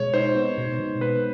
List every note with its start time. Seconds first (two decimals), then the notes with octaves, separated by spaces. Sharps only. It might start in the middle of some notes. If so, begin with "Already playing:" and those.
Already playing: B2 G#3 C#5
0.14 D#4 C5
0.36 B3
0.58 B2
0.79 B2
1.01 B3 B4